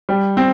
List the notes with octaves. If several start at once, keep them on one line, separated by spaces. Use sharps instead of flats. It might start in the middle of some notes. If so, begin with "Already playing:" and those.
G3
C4